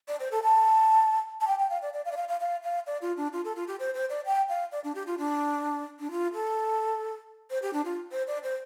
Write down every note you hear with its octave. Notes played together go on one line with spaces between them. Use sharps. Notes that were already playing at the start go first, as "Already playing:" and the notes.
D5
C5
A4
A5
A5
G5
G5
F5
D5
D5
F5
D5
F5
F5
F5
F5
D5
F4
D4
F4
A4
F4
G4
C5
C5
D5
G5
F5
D5
D4
G4
F4
D4
D4
F4
A4
C5
G4
D4
F4
C5
D5
C5